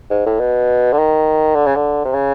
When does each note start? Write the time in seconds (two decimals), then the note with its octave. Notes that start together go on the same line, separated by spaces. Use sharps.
0.10 G#2
0.26 A2
0.40 B2
0.93 D3
0.98 D#3
1.55 D3
1.66 C#3
1.76 D3
2.05 C3
2.13 C#3